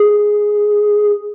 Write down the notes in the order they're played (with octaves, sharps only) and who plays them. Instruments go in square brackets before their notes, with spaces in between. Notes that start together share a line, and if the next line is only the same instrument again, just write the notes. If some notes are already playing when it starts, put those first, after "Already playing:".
Already playing: [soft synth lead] G#4